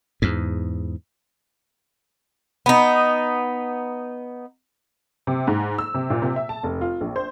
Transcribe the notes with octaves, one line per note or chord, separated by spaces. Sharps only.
E2 G#2
B3 D#4
C3
G#2
E6
C3
A#2
C3
E5
A5
F1
F4
A#1
C5